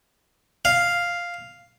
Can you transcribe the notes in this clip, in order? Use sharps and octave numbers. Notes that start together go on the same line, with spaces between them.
F5